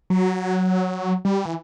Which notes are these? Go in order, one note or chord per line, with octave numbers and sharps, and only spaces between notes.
F#3
G3
E3